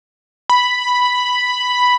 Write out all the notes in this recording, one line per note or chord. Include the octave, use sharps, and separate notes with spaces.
B5